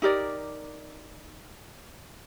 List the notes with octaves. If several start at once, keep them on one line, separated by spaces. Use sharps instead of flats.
D#4 G4 A#4 D5